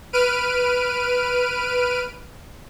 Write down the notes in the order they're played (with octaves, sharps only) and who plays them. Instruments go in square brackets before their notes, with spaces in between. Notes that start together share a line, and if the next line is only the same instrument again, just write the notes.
[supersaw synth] B4 F6 D7 D#7